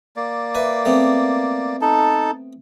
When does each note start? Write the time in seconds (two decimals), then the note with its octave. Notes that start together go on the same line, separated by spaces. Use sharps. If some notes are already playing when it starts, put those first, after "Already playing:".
0.16 A#3 D5
0.55 B4 E5 G#5
0.85 A3 B3 C4
1.81 D#4 A4 A5